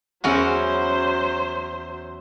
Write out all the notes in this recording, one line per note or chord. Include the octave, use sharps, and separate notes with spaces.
E2 F#3 C#4 F#4 C5